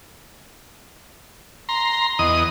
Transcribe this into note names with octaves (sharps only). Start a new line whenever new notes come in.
A#5 C6
E2 D#5 D#6